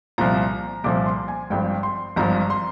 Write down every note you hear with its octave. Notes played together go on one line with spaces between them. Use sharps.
C2 A#2 F3 A#5
C2 A#2 F3 D6
C6
G#5
G#1 G2 F3 G5
C6
G#1 G2 F3 A#5
C6